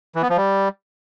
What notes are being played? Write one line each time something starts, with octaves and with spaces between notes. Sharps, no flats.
E3
B3
F3
G3